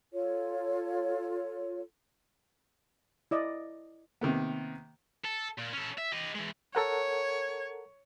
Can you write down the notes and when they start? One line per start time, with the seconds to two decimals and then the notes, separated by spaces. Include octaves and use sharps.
0.13 F4 A4 C#5
3.31 E4 D5 D#5
4.21 C3 D#3 A#3 B3
5.25 A4
5.58 A#2
5.73 C#4 A4
5.98 E5
6.12 G4 D#5
6.35 E3 G#3
6.75 A4 A#4 C#5 F#5